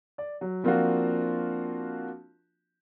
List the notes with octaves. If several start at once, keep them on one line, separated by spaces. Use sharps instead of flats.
D5
F#3
F3 A#3 C4 D4 F4 F#4